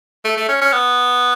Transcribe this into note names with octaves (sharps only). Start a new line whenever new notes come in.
A3
A3
C#4
C#4
B3